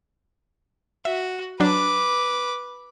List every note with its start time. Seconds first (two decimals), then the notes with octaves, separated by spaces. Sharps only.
1.05 F#4 E5
1.60 F#3 D4 B4 D6